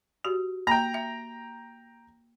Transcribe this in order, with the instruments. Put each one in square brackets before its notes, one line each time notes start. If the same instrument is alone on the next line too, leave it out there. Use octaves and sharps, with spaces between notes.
[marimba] F#4 G4
[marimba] A#3 [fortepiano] G5 A#5
[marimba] E5